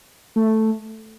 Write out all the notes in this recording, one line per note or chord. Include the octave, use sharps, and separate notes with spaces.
A3